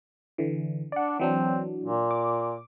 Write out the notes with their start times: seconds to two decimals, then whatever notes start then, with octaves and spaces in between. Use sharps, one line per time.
0.38 D3 E3
0.92 D4 D5 F#5
1.19 E3 F#3 C4 D4
1.84 A#2
2.11 D6